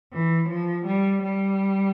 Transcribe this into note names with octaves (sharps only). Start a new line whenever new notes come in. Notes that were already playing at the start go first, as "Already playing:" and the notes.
E3
F3
G3
G3